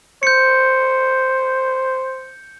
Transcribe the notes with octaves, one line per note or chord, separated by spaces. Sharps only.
C5 G6 C#7